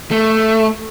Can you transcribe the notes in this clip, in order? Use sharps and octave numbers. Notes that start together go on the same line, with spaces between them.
A3